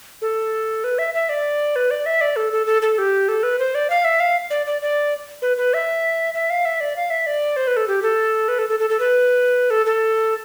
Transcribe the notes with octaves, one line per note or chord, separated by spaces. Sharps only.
A4
B4
E5
E5
D5
B4
D5
E5
D5
A4
A4
A4
A4
G4
A4
B4
C5
D5
F5
E5
F5
D5
D5
D5
B4
B4
E5
E5
F5
E5
D5
F5
E5
D5
C5
B4
A4
G4
A4
B4
A4
A4
A4
A4
B4
A4
A4